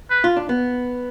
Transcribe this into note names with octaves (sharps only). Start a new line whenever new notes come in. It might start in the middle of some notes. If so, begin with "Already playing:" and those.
B4
F4
D4
B3